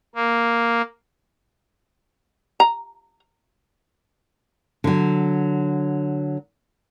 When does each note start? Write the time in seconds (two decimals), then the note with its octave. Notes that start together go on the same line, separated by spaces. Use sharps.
0.15 A#3
2.60 A#5
4.84 D3 F#3